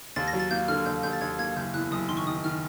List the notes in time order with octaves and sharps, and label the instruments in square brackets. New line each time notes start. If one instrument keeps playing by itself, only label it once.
[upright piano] D#2 [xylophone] A6
[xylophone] A#6
[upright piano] F#3
[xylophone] A6
[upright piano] A#3 [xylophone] G6
[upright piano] D3 [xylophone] F6
[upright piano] D#2 [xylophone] G6
[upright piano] D#2 [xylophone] G6
[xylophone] A6
[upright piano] D#2 [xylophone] G#6
[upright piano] A#3 [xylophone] G#6
[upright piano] F#1 [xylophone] G6
[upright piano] E2 [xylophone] F#6
[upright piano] F#1 [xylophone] D#6
[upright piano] D#3 [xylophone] C6
[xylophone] C#6
[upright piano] D#3 [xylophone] D#6
[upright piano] D#3 [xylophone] F6